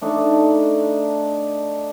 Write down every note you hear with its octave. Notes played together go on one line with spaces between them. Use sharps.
A3 D4 D#4